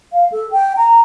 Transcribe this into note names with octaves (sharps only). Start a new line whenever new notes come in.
F5
A4
G5
A#5